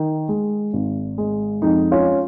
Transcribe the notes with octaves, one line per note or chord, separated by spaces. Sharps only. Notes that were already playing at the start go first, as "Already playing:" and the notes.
Already playing: D#3
G#3
G#1
G#3
F2 D#4
C#4 F4